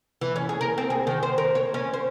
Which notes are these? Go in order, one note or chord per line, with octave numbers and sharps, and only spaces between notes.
E3
C#4
G#4
A#4
C4
G#4
D#3
C5
A#4
C#5
C#4
C5